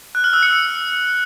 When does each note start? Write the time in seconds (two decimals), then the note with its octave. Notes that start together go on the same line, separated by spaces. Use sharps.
0.15 F#6
0.24 F6
0.33 E6
0.43 C#7